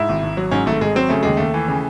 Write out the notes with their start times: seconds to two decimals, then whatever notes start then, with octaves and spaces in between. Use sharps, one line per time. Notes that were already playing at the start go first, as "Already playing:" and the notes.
Already playing: G#2 E4
0.09 G#1
0.22 G#1
0.37 F#3
0.51 G#2 C#4
0.66 G#1 A3
0.81 G#1 G#3
0.95 F#3 C4
1.09 C#3 A3
1.23 D#2 G#3
1.37 D#2 A3
1.54 E3
1.68 C#3